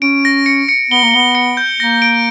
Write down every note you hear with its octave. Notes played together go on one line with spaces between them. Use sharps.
C#4 D7
A#6
C#7
C#7
B3 G7
A#3
B3 G7
C#7
G6
A#3 A#6
D7